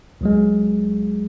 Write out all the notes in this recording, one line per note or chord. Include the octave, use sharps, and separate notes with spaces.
C#2 F#3 G#3